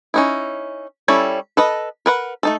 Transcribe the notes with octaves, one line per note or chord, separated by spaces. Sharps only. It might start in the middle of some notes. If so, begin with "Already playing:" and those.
C#4 D#4 E4
G3 C#4 E4 A4 C#5
A4 B4 D#5
A#4 B4 F#5
A3 D#4 A4